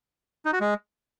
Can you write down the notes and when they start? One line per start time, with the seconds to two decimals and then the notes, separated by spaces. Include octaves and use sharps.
0.45 D#4
0.53 F#4
0.61 G#3